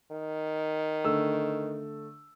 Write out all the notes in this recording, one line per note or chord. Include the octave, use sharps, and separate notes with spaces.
D#3
D3 A3 E6